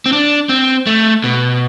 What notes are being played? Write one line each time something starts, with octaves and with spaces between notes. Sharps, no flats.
C4
D4
C4
A3
B2